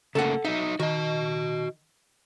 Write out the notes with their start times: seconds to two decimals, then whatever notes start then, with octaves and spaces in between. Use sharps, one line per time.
0.15 C#3 A3 A#3 A4 F#5
0.45 F#3 D#4 E5
0.80 D#3 F#4 D#5